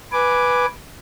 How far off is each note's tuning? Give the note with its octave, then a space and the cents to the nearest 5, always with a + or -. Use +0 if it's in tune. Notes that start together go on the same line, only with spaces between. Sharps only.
B4 -5 G#5 +0 D6 +0